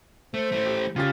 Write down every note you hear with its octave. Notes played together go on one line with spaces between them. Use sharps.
A3 C5
E3 A3
G4
C#3 F4 G4 A6